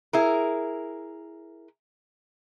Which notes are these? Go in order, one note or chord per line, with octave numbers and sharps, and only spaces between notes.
E4 G#4 A#4